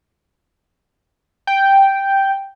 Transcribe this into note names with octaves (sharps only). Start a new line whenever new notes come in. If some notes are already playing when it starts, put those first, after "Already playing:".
G5